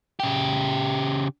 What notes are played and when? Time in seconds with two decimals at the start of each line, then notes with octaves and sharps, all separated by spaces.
0.20 C#3 G4